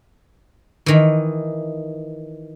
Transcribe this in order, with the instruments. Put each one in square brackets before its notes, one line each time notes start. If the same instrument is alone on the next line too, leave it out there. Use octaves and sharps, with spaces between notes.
[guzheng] D#3 E3